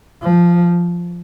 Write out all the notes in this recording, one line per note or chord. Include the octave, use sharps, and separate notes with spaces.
F3